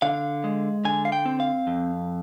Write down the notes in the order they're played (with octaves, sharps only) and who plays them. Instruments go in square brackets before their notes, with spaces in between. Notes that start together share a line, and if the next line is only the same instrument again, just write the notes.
[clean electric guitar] D3 F5
G#3
D3 G#5
F5
G5
C4
F5
F2